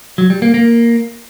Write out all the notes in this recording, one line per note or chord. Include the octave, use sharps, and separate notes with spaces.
F#3
G3
A#3
A#3